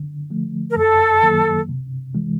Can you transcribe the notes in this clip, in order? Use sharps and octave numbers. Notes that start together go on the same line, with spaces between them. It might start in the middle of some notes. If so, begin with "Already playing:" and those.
Already playing: D3
F3 A3
A#4
F#2 A4
D#3 F#3 A#3
C3
E3 G#3